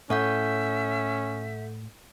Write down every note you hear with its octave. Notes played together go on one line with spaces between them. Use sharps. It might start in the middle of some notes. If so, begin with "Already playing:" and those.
A2 C#4 A4 E5 F#5 G6